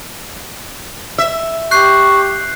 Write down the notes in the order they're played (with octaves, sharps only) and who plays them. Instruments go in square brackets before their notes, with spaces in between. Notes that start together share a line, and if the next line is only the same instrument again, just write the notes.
[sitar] E5
[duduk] G4 [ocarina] C#6 [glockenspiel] F#6 G6 C7